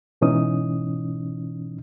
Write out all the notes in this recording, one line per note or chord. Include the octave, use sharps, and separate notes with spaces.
G#2 B2 E3 C#4 D#4 D#6